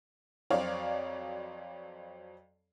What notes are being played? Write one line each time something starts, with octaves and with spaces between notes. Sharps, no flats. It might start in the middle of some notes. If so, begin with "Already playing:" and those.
F2 F#3 C4 C#5 D5 F5